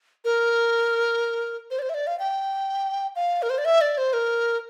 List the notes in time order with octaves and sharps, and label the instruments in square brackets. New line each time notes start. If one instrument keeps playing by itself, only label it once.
[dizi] A#4
C5
D5
C5
E5
D5
F5
G5
F5
A#4
C5
D5
E5
D5
C5
A#4